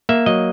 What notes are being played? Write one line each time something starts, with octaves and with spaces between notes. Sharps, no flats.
A#3 E5
F#3 D#5